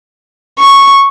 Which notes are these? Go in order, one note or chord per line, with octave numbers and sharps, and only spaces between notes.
C#6